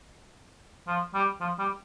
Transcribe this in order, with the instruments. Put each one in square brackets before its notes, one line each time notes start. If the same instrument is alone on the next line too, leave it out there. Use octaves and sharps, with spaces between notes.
[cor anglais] F3
G3
F3
G3